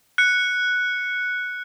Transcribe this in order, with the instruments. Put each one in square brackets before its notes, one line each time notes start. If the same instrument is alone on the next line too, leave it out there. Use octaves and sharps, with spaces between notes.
[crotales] F#6 C#7